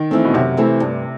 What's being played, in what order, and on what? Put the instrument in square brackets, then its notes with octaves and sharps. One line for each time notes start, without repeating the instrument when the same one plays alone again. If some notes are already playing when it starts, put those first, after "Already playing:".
Already playing: [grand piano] D#3
[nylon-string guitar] E3 A3 C4
[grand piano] B2
[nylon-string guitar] F#2 [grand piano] C3
[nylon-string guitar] E3 A3 C4
G2